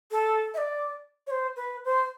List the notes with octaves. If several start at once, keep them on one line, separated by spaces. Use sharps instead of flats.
A4
E5
D5
C#5
C5
B4
C5